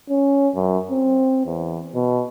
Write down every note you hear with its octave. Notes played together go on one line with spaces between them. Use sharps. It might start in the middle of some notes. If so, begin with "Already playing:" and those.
C#4
F#2
C4
E2
B2